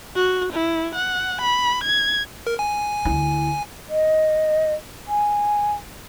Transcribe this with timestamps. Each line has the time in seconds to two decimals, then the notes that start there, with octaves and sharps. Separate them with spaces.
0.15 F#4
0.53 E4
0.95 F#5
1.41 B5
1.84 G#6
2.47 A#4
2.59 G#5
3.05 D2 E4
3.89 D#5
5.08 G#5